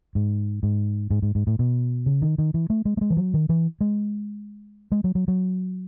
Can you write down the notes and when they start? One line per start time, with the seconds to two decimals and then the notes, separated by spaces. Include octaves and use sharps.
0.15 G#2
0.63 G#2
1.10 G#2
1.22 G#2
1.35 G#2
1.47 A2
1.59 B2
2.06 C#3
2.22 D#3
2.38 D#3
2.54 E3
2.70 A3
2.85 G#3
2.97 A3
3.01 G#3
3.10 E3
3.17 F#3
3.34 D#3
3.49 E3
3.81 G#3
4.92 G#3
5.04 F#3
5.15 F#3
5.28 F#3